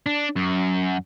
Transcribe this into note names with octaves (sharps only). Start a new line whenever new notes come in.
D4
F#2